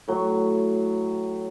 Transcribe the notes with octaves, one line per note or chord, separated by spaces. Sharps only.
A2 F#3